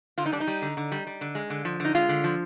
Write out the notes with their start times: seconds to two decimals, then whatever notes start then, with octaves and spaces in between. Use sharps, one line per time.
0.18 D3 F4
0.26 D#4
0.32 G3 D4
0.40 D#4
0.47 G3
0.62 D3
0.77 D3
0.92 G3
1.07 G3
1.21 D3
1.35 G#3
1.50 D3
1.65 F3
1.80 D3 D#4
1.95 G#3 F4
2.09 D3
2.24 F3